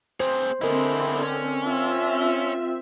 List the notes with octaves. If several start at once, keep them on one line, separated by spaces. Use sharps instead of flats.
C4 G#4 C5
D3 C4 E4 G#4 A#4 D#5
C#4
C4 F4 E5